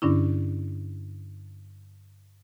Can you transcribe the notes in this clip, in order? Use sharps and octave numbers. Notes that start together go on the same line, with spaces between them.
G2 D3 C#4 D4 E4